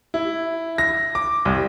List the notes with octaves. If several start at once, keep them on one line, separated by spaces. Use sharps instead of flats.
E4
A#6
D6
C2